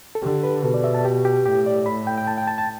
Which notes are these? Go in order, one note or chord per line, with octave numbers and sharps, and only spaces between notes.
A4
D3 G4
B4
B2 A4
D5
E5
A5
G4
G4
A2 G4
D5
B5
G5
G5
A5
G5
A5
A5